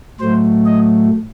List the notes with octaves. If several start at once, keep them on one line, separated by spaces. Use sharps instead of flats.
A2 F#3 A3 C5
D#5